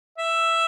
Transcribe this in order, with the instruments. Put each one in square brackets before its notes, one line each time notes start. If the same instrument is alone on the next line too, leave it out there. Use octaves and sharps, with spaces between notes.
[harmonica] E5